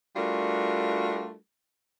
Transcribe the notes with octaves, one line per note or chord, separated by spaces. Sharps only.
G3 A3 D4 F4 F#4 A#4